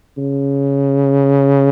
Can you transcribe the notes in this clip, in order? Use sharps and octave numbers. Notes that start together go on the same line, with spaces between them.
C#3